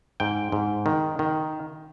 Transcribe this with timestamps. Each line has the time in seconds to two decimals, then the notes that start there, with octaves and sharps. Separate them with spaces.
0.20 G#2 G5
0.52 G#2
0.86 D#3
1.19 D#3